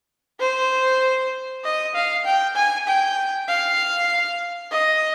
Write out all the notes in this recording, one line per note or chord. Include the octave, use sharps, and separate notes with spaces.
C5
D#5
F5
G5
G#5
G5
F5
D#5